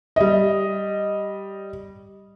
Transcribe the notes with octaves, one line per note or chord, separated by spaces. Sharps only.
G3 D#5